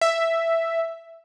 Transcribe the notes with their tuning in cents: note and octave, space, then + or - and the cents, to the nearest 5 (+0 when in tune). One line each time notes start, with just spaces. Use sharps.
E5 +5